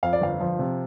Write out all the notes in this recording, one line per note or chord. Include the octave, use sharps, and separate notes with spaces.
F2 F5
D5
G1 F5
F3
C3